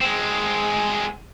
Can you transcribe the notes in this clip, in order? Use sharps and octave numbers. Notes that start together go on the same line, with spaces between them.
G#3 C4